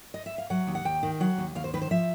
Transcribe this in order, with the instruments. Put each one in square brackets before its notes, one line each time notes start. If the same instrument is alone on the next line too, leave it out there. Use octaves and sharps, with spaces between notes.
[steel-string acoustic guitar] D#5
E5
F5
F#3 F#5
D#2
F#5
D#2 G5
D#3
F#3 F#5
D#2
D#2 F5
C5
D#3 B4
C5
F3 E5